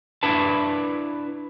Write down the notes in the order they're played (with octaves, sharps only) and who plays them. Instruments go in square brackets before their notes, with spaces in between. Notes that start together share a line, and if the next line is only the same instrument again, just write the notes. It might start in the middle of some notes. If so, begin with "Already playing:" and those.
[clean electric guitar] D4 E4 B4 A5